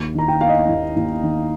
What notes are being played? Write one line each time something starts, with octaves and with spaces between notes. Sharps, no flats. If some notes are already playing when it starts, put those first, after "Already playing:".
Already playing: D#2
D#3 A#5
G5
A#3 F5
D#5
D#2
D#2
D#3